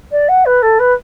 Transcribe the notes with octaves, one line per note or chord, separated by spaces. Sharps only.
D5
F#5
B4
A4
B4